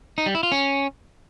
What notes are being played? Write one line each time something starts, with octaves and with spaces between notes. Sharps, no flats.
D#4
G3
E4
F4
C#4